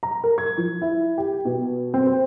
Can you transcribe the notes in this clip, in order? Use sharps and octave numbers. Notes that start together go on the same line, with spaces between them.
A#5
A#4
G#6
F3
E4
G4
B2
C4
C5